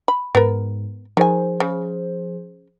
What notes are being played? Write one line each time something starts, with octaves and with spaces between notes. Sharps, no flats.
B5
G#2 B3 A#4
D#3 F3 G#4 C5 G#5
C#3